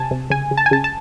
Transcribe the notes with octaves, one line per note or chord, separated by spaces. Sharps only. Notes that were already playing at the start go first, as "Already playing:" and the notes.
Already playing: C3 G#5 A5
C3
C#3 G#5
C#3
A5
G#5
C#3 A5
A5